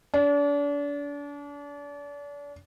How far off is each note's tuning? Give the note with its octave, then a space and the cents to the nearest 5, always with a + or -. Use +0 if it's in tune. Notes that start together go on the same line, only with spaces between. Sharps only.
D4 -35